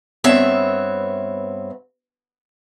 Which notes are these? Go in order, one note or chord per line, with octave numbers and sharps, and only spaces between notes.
G2 B3 C4 C#5 E5